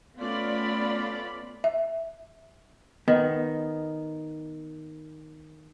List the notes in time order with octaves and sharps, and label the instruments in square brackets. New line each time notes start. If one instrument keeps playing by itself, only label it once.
[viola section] A3 B3 C#4 F4 D5 B5
[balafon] E5
[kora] D#3 [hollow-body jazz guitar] B3